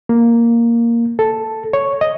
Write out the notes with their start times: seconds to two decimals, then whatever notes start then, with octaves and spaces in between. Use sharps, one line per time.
0.09 A#3
1.19 A4
1.73 C#5
2.01 D#5